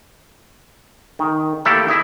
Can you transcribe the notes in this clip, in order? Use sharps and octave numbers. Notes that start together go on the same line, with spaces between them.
D#3
A3 A#3 E4 G4 A4 D5
E4 D#5 E5